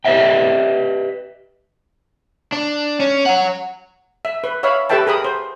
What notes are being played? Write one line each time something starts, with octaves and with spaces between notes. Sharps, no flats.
G4 B4 D#5 E5 G5
D4
C#4
C#5 F#5
E5
B4
C#5 E5 F5 B5
G4 A4 B4 E5 G5 A5
G#4 A#4 B5 D#6
C5